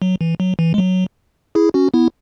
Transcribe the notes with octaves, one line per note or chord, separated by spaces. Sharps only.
F#3
E3
F#3
E3
G#3
F#3
E4 G#4
C#4 F#4
B3 E4